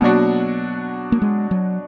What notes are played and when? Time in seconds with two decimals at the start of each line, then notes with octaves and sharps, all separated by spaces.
0.01 B2 F#3 A#3 D4 F#4
1.12 A#3
1.22 G#3
1.51 F#3